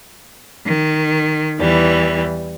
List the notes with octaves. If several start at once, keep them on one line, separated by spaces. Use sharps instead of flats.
D#3
E2 E3 G3